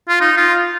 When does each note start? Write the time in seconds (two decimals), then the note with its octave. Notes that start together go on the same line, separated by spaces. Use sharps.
0.09 F4
0.21 D#4
0.37 F4